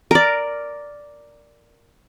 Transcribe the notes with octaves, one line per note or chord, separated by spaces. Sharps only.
A#4 D5